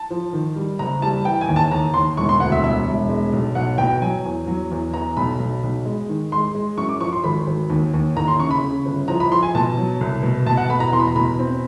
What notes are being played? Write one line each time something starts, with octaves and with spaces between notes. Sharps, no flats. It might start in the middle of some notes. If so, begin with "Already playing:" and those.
Already playing: A5
F3
D#3
G3
F#1 A#5
G3 A5
E3 G5
G#5
D#2
A5
D#2 A#5
D#2 C6
E1 C#6
C6
D2 F#5
E5
E1 E5
E1
G#3
B1
B1 F#5
B2 G5
F#3 G#5
E2
F#3
E2
E3 A#5
B1 B5
B1
B1
G#3
D#3
G#3 C6
G#3
F#2 C#6
D6
F3 C#6
C6
G#1 B5
G#1
D#2
D#2
D#2 A#5
C6
C#3 C#6
B5
C#3
G1
F3 A#5
B5
F3 C6
G#5
B2 A5
F#3
C2
B2
B2 A5
F#5
B2 B5
A#5
E2 C6
B5
A#5
B2 B5
C4